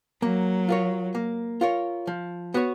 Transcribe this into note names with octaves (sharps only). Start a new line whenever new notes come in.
F#3 A#3
F4 A#4 C#5
A#3
F4 A#4 C#5
F3
B3 F#4 C#5